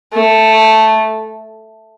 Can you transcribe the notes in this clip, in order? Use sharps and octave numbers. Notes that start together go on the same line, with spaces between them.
A3